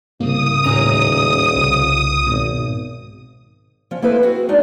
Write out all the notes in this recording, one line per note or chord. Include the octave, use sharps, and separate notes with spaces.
C2 G#2 C#3 A#3 D#6
D#1 A2 C#4 A#5
C2 C#3 F4
G#1 G#2 B2
F3 C#4
A#3 C4 E4 A4 B4 C5
C4 F#4 G#4
G#3 D4 D#4 D5